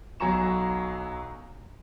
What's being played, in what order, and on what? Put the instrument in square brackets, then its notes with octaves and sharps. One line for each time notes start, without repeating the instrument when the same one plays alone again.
[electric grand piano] B1 F#3 G#5 A#5 C#6 E7